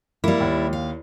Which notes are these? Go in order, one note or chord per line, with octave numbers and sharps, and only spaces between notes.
G3 A#3 E4
D#2
F5